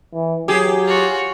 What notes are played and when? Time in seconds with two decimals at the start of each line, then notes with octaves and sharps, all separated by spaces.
0.14 E3
0.48 F#3 G4 G#4
0.85 F4 F#4